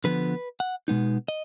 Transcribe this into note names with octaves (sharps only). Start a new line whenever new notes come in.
D3 F3 B3 B4
F#5
B2 G#3 B3 D#4
D#5